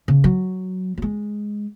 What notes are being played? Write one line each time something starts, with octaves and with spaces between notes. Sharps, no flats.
C#3
F#3
F#3
G#3